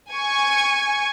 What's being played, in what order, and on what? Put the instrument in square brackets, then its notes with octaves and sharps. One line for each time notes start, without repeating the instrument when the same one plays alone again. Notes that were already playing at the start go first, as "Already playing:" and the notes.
[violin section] G#5 C#6